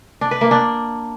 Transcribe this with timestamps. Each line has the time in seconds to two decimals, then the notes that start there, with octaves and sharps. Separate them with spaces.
0.21 D4
0.31 B4
0.41 A#3
0.51 D4